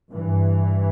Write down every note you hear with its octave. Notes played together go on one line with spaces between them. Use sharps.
G2 E3